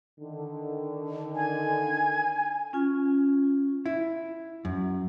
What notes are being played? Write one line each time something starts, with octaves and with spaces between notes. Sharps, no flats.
D3 D#3
G#5
C#4 F4
E4
F#2